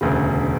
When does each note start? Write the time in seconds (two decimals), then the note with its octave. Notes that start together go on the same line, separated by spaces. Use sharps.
0.01 E1 D2 C#3